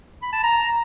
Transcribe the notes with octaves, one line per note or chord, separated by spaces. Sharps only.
B5
A5
A#5